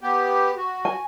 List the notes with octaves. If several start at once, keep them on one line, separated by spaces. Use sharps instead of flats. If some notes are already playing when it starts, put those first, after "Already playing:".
B3 G4
F#4
G#5